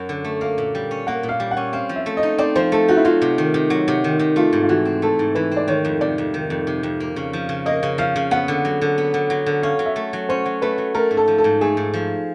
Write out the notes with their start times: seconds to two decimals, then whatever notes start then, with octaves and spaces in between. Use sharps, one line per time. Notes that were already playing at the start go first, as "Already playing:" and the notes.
Already playing: F#2 F#3
0.09 D3
0.24 A3
0.41 A#3 F5
0.58 A#2
0.75 G3
0.91 C#4
1.07 A#3 F#5
1.23 A#2
1.29 F5
1.40 G3
1.51 F#5
1.57 C#4
1.73 C4 F5
1.89 F3
1.96 E5
2.06 A3
2.17 D#5
2.23 D#4
2.38 C4 D5
2.56 F3 C5
2.72 A3 A4
2.88 D#4 F#4
2.97 E4
3.05 F#3 F4
3.22 C3
3.38 D#3
3.54 C3
3.70 F#3
3.88 C3
4.04 D#3
4.19 C3
4.36 A3 F4
4.53 G#2
4.63 F4
4.69 E3 F#4
4.85 C4
5.02 A3 A4
5.19 G#2
5.35 E3 B4
5.51 C4
5.57 D5
5.68 D#3 C#5
5.85 F2
6.01 C3 D5
6.18 F2
6.34 D#3
6.50 F2
6.67 C3
6.83 F2
7.00 A#3
7.16 C#3
7.33 F3
7.49 C#3
7.66 A#3 D#5
7.83 C#3
7.98 F3 F5
8.16 C#3
8.31 B3 F#5
8.48 D3
8.65 F#3
8.81 D3
8.98 B3
9.14 D3
9.30 F#3
9.46 D3
9.63 C#4 F5
9.79 F#3
9.86 E5
9.96 A3
10.13 F#3
10.29 C#4 C5
10.46 F#3
10.62 A3 B4
10.78 F#3
10.94 A3 A#4
11.11 G#2
11.17 A4
11.28 F3
11.38 A4
11.44 G#2
11.61 A3 G#4
11.77 G#2
11.94 F3